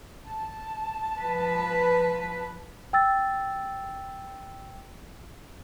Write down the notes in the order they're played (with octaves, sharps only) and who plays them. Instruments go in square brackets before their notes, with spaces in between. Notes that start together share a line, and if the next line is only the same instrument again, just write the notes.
[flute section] A5
[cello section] F3 B4
[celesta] G5 E6 A6